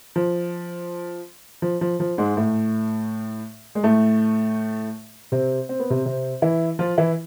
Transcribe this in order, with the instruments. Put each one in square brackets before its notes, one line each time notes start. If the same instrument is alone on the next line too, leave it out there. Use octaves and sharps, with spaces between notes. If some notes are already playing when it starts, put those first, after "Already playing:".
[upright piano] F3
F3
F3
F3
G#2 G#3
A2 A3
G#3
A2 A3
C3 C4
C4
B3
C3 C4
C3 C4
E3 E4
F3 F4
E3 E4